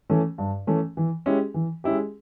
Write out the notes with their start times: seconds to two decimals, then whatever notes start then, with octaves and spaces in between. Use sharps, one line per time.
0.10 E3 A3 C#4
0.38 G2
0.67 E3 A3 C#4
0.97 E3
1.26 G#3 C#4 E4 G4
1.54 E3
1.84 G#3 C#4 E4 G4